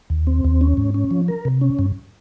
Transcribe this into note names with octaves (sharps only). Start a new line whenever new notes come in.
D#2
C4
D#2
C#4
G#2
C#4
F3
A#4
C3
C#4
G2